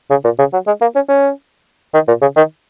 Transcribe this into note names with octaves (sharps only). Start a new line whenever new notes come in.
C#3
A#2
C#3
F#3
G#3
A#3
C#4
C#4
D#3
A#2
C#3
D#3